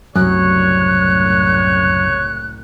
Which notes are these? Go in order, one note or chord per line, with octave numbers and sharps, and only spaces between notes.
F#1 C2 F#2 A2 C#5 F#6